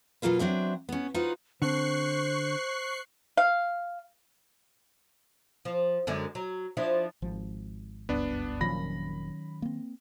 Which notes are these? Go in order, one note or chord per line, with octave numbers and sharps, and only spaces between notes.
B2 F#3 A#3 F4 B4
F#3 C4 D4 E5
B3 C#4
D#4 F4 F#4 B4 C5
D3 C4 C5 C#6 F#6 C7
F5
F3
F#2 D3 G#3
F#3
F3 D4 E4
G#1 F3
F#1 C#2 G2 B3 D4
F1 A#2 D#3 F3 F#3 C#4 B5 A#6
A#3 C4